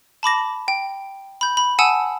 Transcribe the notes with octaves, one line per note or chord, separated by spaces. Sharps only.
A5 B5 D6 A#6
G5
B5 G6
B5
F#5 G#5 A5 D#6 E6 E7